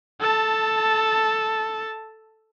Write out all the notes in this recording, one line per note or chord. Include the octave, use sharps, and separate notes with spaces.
A4 A5